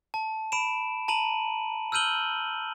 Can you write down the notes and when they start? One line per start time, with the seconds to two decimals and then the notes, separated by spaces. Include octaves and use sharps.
0.14 A5
0.52 B5 D7 E7
1.08 A5 A#5 D#7 F#7
1.92 E6 F6 G6 D#7 F#7 G7